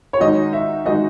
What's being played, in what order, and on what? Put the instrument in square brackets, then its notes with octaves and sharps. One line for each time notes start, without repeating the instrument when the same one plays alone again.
[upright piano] C#5
[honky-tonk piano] D#3 G#3 D#4 F#4 [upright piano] D#5
[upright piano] E5
[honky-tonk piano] D#3 G#3 D#4 F#4 [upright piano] D#5